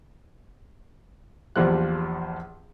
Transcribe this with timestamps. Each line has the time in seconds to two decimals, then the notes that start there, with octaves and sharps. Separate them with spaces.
1.56 A#1 E2 F3 G3 F#6